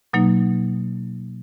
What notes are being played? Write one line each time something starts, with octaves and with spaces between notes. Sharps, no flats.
B2 F#3 A#3 D#4